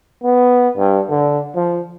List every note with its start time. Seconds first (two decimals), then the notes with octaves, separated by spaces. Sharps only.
0.23 B3
0.77 G2
1.10 D3
1.55 F3